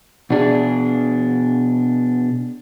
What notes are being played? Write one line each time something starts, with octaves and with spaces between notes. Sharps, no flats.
B2 D4 G#4